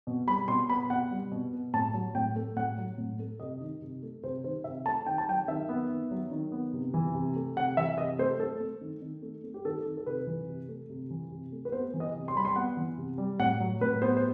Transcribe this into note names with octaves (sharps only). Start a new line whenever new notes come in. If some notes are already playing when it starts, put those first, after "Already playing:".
B2
G3 B5
B2 C6
B3 B5
B2 F#5
G3
B2
B3
A2 A5
F#3
A2 G5
A3
A2 F#5
F#3
A2
A3
C3 D#5
D#3
C3
A3
C3 C5
D#3 C5
C3 E5
A3 A5
D#3 G5
A5
F#3 G5
D#3 E5
B3
D#3
F#3
D#3
B3
C3
E3
C3
A3
C3 F#5
E3 E5
C3 D#5
A3 C5
A3 A4
A3
D#3
D#3
A3
A3
G4
D#3 A4
D#3
A4
C3 B4
E3
C3
A3
C3
E3
C3
A3
B4
B3 C5
E3
D#5
C3
C6
G3 B5
C6
B3 F#5
E3
C3
G3
A2 F#5
F#3
A2 B4
B3 C5
C5